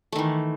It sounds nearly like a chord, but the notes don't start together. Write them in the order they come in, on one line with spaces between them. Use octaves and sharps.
A3 D#3 E3